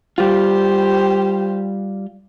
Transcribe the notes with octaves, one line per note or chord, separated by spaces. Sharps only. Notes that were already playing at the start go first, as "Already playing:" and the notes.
G3 F4 G4 C5